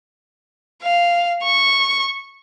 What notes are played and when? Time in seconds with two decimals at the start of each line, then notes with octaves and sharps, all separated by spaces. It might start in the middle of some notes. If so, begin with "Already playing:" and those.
0.82 F5
1.43 C#6